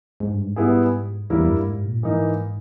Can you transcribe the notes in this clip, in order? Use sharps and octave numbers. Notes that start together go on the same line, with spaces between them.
G#2
G2
G#2
G3 B3 E4 G#4
E2 G3 A#3 E4 A#4
G2
G#2
A#2
G2
G#2 E3 A#3 D#4